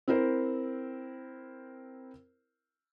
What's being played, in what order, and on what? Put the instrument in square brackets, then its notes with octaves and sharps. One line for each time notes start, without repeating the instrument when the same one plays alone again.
[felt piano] C4 E4 A#4 C5